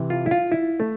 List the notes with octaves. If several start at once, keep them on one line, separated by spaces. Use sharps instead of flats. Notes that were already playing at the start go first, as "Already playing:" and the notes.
Already playing: C3 E3
F4
E4
F4
E4
A3